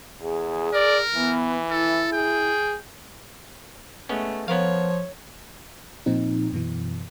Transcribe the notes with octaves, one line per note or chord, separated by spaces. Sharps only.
E2 G#4
A#4 D5
E3 B3
E4 A4
G#4 G5
G#3 A3 B3 C#4
F3 B3 A#4 C#5 F5
A#2 F3 C4 D#4
F#2 B2 E3